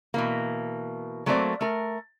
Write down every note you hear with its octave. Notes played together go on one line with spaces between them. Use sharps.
B2 E3 A#3
F#3 A3 A#3 C4 C5 D5
A3 A#4